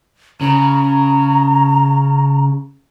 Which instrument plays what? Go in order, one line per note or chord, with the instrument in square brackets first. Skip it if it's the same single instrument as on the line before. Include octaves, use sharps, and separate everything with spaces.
[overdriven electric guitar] C#3 [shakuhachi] A#5